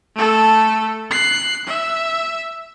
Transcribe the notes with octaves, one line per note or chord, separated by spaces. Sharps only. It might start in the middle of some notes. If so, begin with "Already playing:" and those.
A3 A4
F#6 C7
E5